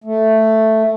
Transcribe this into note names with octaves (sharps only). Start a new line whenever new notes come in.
A3